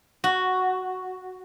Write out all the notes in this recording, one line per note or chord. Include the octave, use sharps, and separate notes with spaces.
F#4